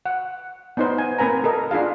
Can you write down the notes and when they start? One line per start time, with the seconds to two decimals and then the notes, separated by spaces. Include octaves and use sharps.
0.06 F#5
0.77 B3 D#4 C5
0.98 G#5
1.18 A#3 C4 B4 G#5 A#5
1.44 A4 A#4 D#5
1.71 D4 F4 G#4 F5